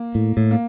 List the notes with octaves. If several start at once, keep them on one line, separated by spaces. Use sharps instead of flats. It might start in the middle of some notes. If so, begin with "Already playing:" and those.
Already playing: A#3
A2
A2
A#3